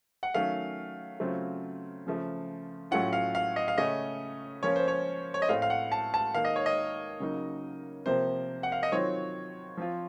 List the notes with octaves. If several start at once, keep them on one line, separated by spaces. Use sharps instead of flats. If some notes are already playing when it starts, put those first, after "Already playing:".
F#5
D#3 F#3 A3 C#4 F5
C#3 F#3 A3 C4 F4
C#3 F3 A3
A2 F#3 A3 C#4 F4 F#5
F5
F5
D#5
F5
C#3 A3 C#4 D#5
F3 A#3 C#4 F4 C#5
C5
C#5
C#5
D#5
A2 A3 C4 F5
F5
F#5
A5
A5
D#3 A#3 D#4 F5
D#5
C#5
D#5
C#3 F#3 A#3 D#4
C3 F3 A#3 C5
F#5
F5
D#5
D#3 F#3 C4 F4 C#5
F3 C4 F4